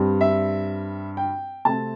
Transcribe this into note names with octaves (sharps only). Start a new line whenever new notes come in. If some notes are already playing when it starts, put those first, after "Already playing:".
Already playing: G2 G3 C4
E5
G5
C3 A3 C4 A5